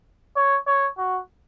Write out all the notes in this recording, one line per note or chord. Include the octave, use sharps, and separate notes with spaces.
C#5
C#5
F#4